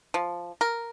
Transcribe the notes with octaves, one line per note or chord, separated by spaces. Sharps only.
F3
A#4